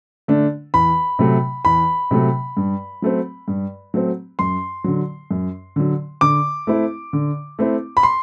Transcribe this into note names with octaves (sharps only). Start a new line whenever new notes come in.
D3 A3 D4
E2 B5
C3 F#3 A3
E2 B5
C3 F#3 A3
G2
F#3 A3 C4
G2
F#3 A3 C4
F#2 C6
D3 F#3
F#2
D3 F#3
D3 D6
A3 C4 E4
D3
A3 C4 E4
B5
C6